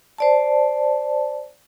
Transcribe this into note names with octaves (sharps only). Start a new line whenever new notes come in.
C5 D5 A5